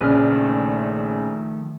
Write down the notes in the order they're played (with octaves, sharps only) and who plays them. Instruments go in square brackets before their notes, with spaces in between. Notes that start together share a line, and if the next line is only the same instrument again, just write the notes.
[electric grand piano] A#1 C#3 D5 [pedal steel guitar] B4 F6
[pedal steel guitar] D#3 F3 A3